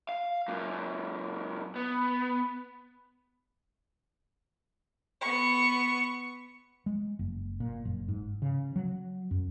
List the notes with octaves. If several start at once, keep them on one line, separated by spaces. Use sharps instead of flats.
F5
F#2 A#2
B3
B3 C#6
G#3
F#1
A#2
F#1
G#2
C#3
F#3
F#2